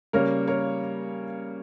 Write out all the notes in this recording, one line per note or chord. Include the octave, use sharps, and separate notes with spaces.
C#3 G3 A#3 A#4 C#5
A#4 C#5